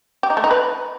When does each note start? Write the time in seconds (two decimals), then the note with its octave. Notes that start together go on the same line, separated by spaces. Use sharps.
0.23 G4
0.30 D#4
0.37 A3
0.44 D#4
0.51 B4